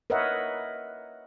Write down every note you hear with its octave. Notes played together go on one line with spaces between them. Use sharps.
A#4 B4 C#5 D#5 E5 F#5